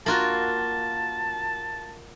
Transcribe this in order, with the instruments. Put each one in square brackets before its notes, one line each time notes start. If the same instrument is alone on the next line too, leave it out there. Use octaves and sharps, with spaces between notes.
[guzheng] A#3 F4 F#4 [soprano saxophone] A5